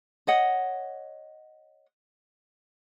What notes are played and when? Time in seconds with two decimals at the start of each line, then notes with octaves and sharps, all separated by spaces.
0.27 C#5 D#5 F#5